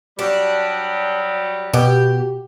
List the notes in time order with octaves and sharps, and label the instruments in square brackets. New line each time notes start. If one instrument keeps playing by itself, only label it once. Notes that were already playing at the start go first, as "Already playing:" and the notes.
[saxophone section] F#3 G3 [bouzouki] D4
[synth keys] B2 [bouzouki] G4